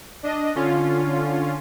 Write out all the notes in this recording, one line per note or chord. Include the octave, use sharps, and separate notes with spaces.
D4 D#5
D3 C#4 F4